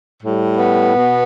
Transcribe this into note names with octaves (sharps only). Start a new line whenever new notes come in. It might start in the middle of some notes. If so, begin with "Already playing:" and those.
A2 G3
B3
B2